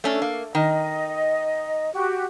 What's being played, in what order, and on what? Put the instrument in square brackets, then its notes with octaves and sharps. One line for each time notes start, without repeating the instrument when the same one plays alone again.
[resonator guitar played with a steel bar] A3 C#4 D4
A#3
[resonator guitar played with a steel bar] D#3 [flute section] D#5
[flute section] F#4 G4